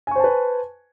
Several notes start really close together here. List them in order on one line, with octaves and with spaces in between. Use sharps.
G#5 C#6 C5 A5 B4